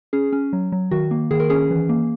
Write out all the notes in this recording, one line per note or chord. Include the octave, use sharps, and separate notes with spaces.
C#4 G#4
C#4
F#3
F#3
D#3 F#4
A#3
D#3 G#4
A#4
C#4 G#4
E3
A#3